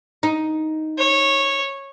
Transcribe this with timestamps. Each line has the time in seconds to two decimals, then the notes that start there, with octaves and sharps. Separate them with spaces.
0.23 D#4
0.98 C#5